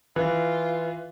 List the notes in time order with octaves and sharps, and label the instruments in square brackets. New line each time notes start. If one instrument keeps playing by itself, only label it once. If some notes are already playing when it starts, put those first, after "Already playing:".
[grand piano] E3 [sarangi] F4